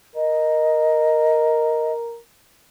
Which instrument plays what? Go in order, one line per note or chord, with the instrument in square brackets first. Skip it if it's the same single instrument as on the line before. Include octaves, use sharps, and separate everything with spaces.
[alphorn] A#4 [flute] D#5